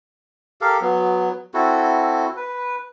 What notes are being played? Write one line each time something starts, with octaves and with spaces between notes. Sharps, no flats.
G4 A4 A#4 F5
F#3 B3
C4 E4 F#4 A4
B4